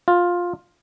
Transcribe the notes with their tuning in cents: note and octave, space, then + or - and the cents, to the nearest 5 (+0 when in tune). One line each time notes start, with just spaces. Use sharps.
F4 +10